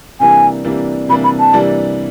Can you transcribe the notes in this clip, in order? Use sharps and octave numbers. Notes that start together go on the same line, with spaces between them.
C3 E3 G3 A#3 D4 G#5
C3 E3 G3 A#3 D4
C3 E3 G3 A#3 D4 B5
B5
A5
C3 E3 G3 A#3 D4